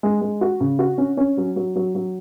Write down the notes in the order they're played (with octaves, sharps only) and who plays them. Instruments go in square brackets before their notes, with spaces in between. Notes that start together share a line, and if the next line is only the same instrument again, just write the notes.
[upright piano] G#3
G#3
F#4
C#3
F#4
C#4
C#4
F#3
F#3
F#3
F#3